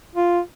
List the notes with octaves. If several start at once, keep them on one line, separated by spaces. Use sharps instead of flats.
F4